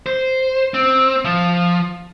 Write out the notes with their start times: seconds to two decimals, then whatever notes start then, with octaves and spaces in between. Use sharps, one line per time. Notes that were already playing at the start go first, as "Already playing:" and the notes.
0.06 C5
0.74 C4
1.25 F3